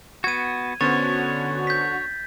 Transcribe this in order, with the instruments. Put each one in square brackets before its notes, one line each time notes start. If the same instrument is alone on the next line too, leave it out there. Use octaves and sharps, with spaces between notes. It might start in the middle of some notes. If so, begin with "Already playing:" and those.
[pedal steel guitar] B3 F#4 [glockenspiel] G#6 D#7
[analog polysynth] D3 F#4 [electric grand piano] B3 C#4 C5 [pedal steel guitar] C#5 [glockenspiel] A6
[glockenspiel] G6 B6